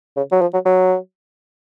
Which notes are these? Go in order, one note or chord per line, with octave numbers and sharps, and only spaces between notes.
C#3
F#3
F3
F#3
F#3